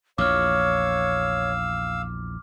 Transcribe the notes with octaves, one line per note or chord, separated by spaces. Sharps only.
A#1 E2 C#5 F5 D6 E6 F6